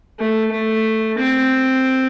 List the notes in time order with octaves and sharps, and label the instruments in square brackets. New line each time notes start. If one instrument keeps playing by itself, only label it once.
[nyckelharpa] A3
A3
C4